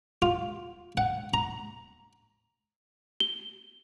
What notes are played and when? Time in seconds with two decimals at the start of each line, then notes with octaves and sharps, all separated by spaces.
0.22 F4
0.97 F#5
1.34 A#5
3.20 G7